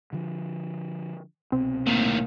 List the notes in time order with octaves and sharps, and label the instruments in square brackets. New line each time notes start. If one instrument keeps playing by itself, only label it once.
[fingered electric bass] D3 F3
[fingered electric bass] C2 B2 [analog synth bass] C4
[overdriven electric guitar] A2 D#3 [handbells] A#3